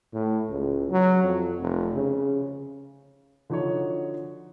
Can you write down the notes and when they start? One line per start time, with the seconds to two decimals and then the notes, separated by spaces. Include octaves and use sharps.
0.14 A2
0.49 C#2
0.91 F#3
1.24 F2
1.60 F1
1.95 C#3
3.50 D3 F3 D#4 F#4 C#5